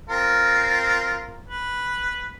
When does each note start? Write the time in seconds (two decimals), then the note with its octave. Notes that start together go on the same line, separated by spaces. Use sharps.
0.09 C4 F4 A#4
1.48 B4